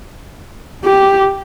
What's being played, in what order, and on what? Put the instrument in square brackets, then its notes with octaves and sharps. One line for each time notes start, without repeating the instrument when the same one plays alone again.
[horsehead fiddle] G4